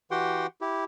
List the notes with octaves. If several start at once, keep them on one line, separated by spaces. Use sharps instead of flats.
E3 F#4 G4 F#5 G5 C6
E4 G4